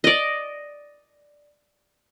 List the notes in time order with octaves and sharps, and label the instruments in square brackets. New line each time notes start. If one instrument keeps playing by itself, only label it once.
[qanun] D5 D#5